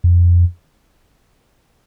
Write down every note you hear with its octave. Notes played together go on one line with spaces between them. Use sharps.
F2